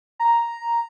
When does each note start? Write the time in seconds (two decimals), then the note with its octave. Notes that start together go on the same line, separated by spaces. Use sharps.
0.20 A#5